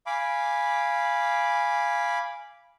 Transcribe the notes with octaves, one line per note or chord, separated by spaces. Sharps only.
F5 G#5 B5 D6